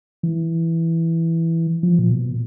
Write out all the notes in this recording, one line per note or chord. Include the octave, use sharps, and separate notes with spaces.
E3
F3
A#2
B2
A#2